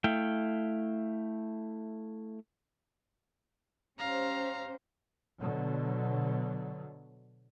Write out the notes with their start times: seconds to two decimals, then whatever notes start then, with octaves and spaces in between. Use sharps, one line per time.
0.04 A3 E4 F5 G5
3.99 C#4 G4 C5 F5 A#5
5.38 B2 D3 F#3